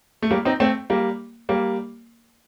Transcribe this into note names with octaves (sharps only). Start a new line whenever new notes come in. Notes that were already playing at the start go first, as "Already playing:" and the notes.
A3
G3 A#3
C4 D#4
A3 C4
G3 A#3
G3 A#3